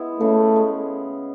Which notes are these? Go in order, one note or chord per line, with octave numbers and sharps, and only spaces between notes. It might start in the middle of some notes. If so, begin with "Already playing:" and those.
Already playing: G#3 B3 E4
C#3 A3
G#3